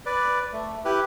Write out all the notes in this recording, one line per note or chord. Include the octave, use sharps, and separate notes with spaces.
B4 D5
A3
E4 G4 B4